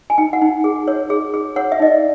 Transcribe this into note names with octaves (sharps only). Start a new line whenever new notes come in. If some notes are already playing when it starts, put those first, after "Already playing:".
G#5
D#4 G5
F#5
D#4
G#4
C#5
G#4
G#4
C#5 F#5
E5
D#4 D#5
D5